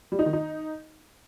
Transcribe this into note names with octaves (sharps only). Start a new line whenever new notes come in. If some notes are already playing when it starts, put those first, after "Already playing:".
G3
D#4
D#3
D#4